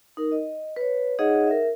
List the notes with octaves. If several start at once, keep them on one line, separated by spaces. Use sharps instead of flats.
D#4 A#4
D#5
B4 C#5
D#4 G#4 C#5 D#5 F5 F#5
A#4 E5